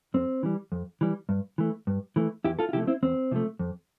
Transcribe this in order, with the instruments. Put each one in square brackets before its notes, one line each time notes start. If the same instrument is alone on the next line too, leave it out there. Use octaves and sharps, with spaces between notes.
[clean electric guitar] F2 C4
E3 G3
F2
E3 G3
G2
E3 A3
G2
E3 A3
E2 E4 G4
F4 A4
F4
C3 F3 A3 E4 G4
C4 E4
E2 C4
C3 F3 A3
F2